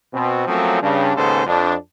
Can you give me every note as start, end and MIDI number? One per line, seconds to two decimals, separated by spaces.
0.14 0.46 47
0.14 0.46 60
0.48 0.81 53
0.48 0.81 54
0.48 0.81 57
0.48 0.81 58
0.48 0.81 60
0.48 0.81 61
0.82 1.12 43
0.82 1.12 49
0.82 1.12 62
1.16 1.43 39
1.16 1.43 44
1.16 1.43 49
1.16 1.43 59
1.16 1.43 69
1.16 1.43 72
1.47 1.75 41
1.47 1.75 62